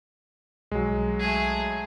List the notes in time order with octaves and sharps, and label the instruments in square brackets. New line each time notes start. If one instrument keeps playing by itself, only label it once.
[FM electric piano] B1 [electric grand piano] F#3 G#3
[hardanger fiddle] A3 G#4